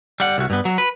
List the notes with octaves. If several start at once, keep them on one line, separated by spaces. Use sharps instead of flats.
G3 F#5
C2 F#4
G2 B3
F#3
B4